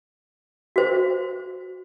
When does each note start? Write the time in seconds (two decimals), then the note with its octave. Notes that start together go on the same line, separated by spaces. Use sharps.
0.76 F#4 C5